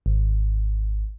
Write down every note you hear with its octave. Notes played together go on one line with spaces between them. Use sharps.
G#1